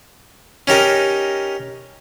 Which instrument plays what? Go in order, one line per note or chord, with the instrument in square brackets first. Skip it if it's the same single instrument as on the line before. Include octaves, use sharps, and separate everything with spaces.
[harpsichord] C#4 D#4 G4 A#4